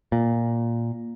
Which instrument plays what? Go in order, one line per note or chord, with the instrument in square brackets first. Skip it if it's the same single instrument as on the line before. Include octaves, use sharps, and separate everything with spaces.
[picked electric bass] A#2